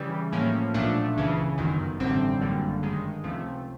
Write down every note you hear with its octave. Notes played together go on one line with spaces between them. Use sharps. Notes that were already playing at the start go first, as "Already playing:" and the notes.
Already playing: C#3 E3 G3
A2 F3 A#3 C#4
B1 A#2 F3 A3 D4
C#2 C#3 E3
G1 F#2 D#3
A1 G2 D3 G3 C4
G#1 F#2 D3 G3 A#3
G2 D#3 G#3
C#2 C3 F3 A3